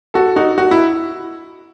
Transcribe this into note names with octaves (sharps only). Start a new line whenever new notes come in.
F#4 A4
D#4 F#4
F#4
E4